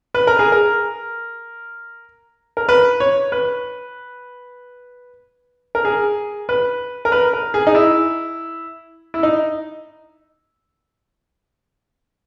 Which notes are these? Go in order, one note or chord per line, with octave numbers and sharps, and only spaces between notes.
B4
A#4
G#4
A#4
A#4
B4
C#5
B4
A#4
G#4
B4
A#4
B4
A#4
G#4
D#4
E4
E4
D#4